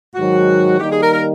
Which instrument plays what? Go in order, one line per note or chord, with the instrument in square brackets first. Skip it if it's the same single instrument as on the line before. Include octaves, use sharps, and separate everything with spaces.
[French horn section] G#2 D#3 F#3 [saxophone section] F#4
[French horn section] D#3 G3 A#3 D#4 [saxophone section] G4
[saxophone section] G#4
A#4
A#4